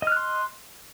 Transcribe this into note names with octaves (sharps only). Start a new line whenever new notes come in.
D#5 C6 F6 F#6